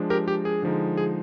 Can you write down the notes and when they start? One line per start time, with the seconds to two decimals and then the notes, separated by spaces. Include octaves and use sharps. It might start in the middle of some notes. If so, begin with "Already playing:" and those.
Already playing: F3 G#3 D4
0.10 G4 A#4
0.28 G4
0.45 G#4
0.63 D3 F3 G#3 D#4
0.97 G#4